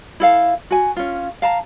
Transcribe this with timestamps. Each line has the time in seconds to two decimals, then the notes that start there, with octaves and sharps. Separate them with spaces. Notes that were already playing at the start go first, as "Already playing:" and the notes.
0.20 E4 A4 F5
0.71 F#4 G#5
0.96 C#4 F4
1.42 F5 A5 A#5